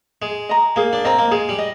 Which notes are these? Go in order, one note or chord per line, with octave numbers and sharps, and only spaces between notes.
G#3 G#4
D#5 A#5
A#3 G#4
D4
C4 D#5 A#5
A#3
G#3 G#4
G3
D#5